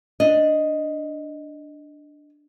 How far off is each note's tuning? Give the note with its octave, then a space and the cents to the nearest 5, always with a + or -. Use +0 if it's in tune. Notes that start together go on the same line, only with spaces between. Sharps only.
D4 +0 D#5 +0